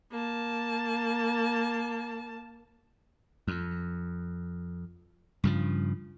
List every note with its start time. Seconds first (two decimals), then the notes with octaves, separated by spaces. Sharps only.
0.11 A#3 A5
3.47 F2
5.44 G2 C#3 F3